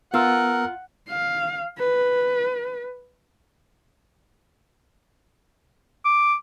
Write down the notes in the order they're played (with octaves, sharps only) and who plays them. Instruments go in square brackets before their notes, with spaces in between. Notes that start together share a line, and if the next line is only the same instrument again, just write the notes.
[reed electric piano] B3 E6 [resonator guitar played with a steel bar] F4 [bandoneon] A#4 [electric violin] F#5
[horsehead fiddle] F5
B4
[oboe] D6